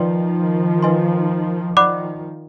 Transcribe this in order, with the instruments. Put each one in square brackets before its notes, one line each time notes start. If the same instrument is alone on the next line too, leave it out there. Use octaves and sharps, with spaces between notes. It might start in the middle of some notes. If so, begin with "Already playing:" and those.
Already playing: [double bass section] D#3 F3 [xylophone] B4 D5 G5 C6
[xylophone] B4 D#5 G#5 C6
[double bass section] D#3 F3 [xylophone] D5 F#5 B5 D6 F#6